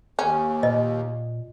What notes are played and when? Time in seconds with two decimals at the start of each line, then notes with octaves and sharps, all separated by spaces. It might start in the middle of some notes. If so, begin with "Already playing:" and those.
0.19 D#2 C#4
0.63 A#2 D#5